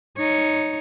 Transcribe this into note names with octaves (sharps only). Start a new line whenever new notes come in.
D#4 C#5